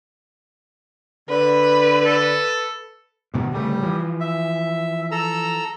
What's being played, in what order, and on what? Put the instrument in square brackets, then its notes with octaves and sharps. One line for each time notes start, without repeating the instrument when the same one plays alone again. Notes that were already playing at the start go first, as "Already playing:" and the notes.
[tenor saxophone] D3 [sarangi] B4
[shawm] A4
[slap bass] G2 B2 D#3
[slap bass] D1 C#3 A3 [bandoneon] G3
[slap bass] E3 F3
[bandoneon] E5
A4 A#5 E6